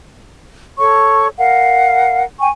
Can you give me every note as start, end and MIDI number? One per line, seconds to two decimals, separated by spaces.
0.78 1.27 69
0.78 1.27 73
0.78 1.27 85
1.37 2.22 70
1.37 2.22 77
1.37 2.22 78
2.40 2.49 79
2.40 2.49 80
2.40 2.49 85